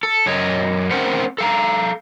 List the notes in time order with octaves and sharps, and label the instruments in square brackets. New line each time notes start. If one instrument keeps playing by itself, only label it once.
[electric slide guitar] A4
F#2 C#5 D#5
A3 C4 C#4 A#4 C5 F#5
A4 F5 A#5